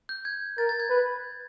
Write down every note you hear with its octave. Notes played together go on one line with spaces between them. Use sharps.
G6
G#6
A#4 A6
A6
G#6
B4